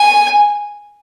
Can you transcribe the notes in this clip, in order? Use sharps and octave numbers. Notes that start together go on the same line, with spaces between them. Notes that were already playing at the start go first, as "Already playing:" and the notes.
Already playing: G#5